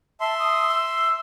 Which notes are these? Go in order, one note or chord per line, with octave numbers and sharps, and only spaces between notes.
E5 A5 C6
D#6
E6